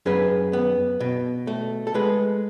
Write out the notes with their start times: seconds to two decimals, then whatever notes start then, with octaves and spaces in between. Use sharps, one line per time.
0.06 F#2 G#4 B4
0.53 B3
1.00 B2
1.47 A3
1.87 A4
1.94 G#3 G#4 B4